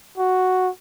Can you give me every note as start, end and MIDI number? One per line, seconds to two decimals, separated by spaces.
0.18 0.69 66